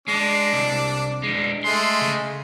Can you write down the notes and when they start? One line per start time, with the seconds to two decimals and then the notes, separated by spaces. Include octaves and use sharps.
0.08 G#3 D4
0.53 C2
1.23 G#3 D4
1.64 G#3 A3 C6
2.01 C#3